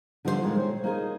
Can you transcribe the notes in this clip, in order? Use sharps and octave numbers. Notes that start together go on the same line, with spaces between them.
D3 F3 G3 F4 G4 C5
A#2 D#3 G#3
C5 C#5
A#3 D#4 G#4